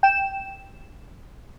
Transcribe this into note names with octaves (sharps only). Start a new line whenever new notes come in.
G5 E7